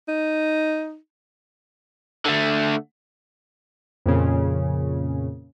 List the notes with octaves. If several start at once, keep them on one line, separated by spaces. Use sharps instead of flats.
D#4
D3 A3
F2 A#2 C#3